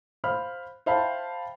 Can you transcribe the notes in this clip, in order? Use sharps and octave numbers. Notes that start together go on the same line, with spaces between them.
C5 F5 B5 F6
C5 E5 F5 G5 A5 B5